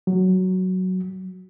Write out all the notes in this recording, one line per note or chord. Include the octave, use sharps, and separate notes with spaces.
F#3